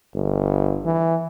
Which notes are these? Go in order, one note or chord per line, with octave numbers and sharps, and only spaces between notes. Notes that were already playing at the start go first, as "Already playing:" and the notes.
G1
E3